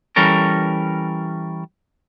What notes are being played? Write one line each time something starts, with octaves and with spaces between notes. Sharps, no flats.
E3 G3 C#4 A4 A#4